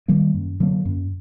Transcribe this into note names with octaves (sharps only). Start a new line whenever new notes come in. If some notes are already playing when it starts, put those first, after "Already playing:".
D#3 G3 A#3
F#2
D3 F#3 A#3
F#2